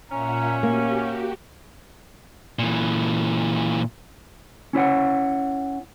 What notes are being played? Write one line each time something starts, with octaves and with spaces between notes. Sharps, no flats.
A#2 C#4 E5 F#5 A#5
A#3 F#4 G4 F5
A#2 E3
C#4 E4 C#5 F#5